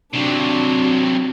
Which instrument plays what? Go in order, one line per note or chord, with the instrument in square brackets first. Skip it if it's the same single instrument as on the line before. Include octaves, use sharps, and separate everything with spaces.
[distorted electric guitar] C3 F#3 [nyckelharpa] D4 F#4